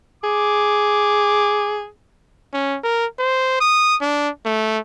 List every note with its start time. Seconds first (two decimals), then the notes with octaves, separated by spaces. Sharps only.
0.24 G#4 D6
2.53 C#4
2.84 A#4
3.19 C5
3.61 D#6
4.01 D4
4.45 A3